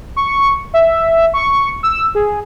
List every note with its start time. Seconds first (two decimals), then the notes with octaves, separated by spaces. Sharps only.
0.16 C#6
0.74 E5
1.34 C#6
1.83 E6
2.15 G#4